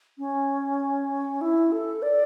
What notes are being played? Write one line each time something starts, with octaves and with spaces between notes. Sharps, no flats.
C#4
E4
A4
D5